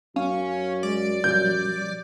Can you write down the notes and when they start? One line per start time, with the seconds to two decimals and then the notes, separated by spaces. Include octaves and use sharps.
0.16 F#2 C#4 F5
0.83 G#3 D5
1.24 F#2 A#2 F3 G3 G6